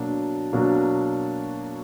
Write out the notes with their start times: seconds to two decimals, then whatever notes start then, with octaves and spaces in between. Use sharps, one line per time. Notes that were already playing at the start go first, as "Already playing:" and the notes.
Already playing: B2 F#3 A#3 D4
0.53 B2 F#3 A#3 D4